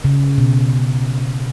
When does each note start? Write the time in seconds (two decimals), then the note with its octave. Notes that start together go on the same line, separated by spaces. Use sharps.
0.04 C#3
0.38 B2